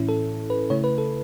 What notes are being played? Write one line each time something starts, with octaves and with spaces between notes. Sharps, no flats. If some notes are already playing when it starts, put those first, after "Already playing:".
Already playing: A2 E3 C#4 E4
A4
B4
C#3 A3 E4 C#5
B4
A4